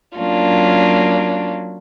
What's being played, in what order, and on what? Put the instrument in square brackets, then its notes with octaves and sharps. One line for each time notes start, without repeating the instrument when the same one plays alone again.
[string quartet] F#3 A#3 C#4 D4 F4